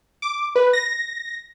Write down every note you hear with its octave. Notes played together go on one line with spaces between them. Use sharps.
D6
B4
A#6